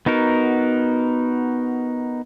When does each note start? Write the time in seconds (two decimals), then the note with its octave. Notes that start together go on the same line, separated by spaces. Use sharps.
0.06 B3 D#4 F#4 A#4